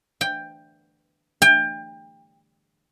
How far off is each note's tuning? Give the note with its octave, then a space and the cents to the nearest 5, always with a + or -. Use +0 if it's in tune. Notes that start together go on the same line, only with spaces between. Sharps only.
G5 +10
G5 +25